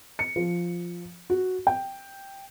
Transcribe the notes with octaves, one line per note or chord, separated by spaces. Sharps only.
C#7
F3
F#4
G5